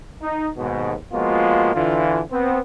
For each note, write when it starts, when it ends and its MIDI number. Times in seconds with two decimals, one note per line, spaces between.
0.22 0.48 63
0.57 0.94 39
0.57 0.94 44
0.57 0.94 47
1.13 1.74 53
1.13 1.74 56
1.13 1.74 58
1.13 1.74 59
1.13 1.74 65
1.13 1.74 66
1.74 2.20 50
1.74 2.20 52
1.74 2.20 65
2.31 2.59 59
2.31 2.59 60